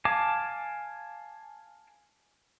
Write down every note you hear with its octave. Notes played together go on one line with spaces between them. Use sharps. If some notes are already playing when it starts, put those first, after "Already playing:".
F5 G#5 A5 D6